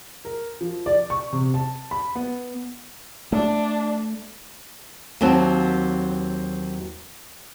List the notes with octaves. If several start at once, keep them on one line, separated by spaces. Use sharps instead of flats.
A#4
F3
D5
C#6
C3
A5
B5
B3
A3 D4
D#2 F#3 C4 F#4 A5